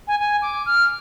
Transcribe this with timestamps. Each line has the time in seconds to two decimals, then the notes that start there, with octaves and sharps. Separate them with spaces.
0.08 G#5
0.20 G#5
0.42 D6
0.66 F6